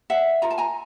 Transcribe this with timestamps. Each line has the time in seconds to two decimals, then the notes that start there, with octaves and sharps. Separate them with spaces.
0.10 E5 F#5
0.42 F4 A#4 A#5
0.51 A5
0.58 G#5 A#5